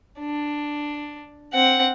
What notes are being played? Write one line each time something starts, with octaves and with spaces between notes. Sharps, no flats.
D4
C4 F#5